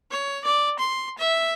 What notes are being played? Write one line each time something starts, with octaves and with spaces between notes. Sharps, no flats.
C#5
D5
C6
E5